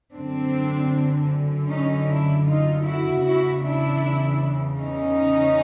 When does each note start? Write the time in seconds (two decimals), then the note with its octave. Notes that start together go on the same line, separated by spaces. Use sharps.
0.13 F#2 D3 C4 D4
1.68 C#4 D#4
2.07 D4 E4
2.46 D#4 F4
2.85 E4 F#4
3.24 E2 C#3 E3 E4 F#4
3.62 D4 E4
4.79 C#4 D#4